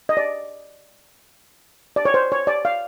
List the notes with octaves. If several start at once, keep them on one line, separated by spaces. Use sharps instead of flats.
D#5
D5
D5
C#5
C5
C#5
D5
F5